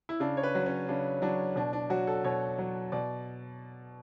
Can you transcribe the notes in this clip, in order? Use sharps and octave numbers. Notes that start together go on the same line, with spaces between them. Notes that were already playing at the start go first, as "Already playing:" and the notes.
E4
C#3 D4
C#5
B4
F#3
C#4
C#3 D4
F#3 D4
B2 D4
D4
F#3 F#4
A4
B2 C#5
F#3
B2 D5